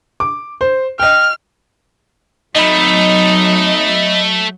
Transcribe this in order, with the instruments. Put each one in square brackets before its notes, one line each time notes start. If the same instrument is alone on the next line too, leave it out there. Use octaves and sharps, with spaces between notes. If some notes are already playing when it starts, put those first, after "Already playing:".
[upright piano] D6
C5
[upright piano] D#5 G5 [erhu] F6
[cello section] F#3 [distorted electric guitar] A3 [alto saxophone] D#4 [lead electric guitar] D#5 B5